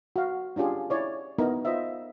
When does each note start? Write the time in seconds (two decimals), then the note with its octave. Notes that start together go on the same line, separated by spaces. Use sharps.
0.16 F#4 F5
0.56 C#4 D4 F4 G4 G#4
0.90 E4 C#5 D5
1.38 B3 D#4 E4 A#4
1.65 F4 C5 D#5 E5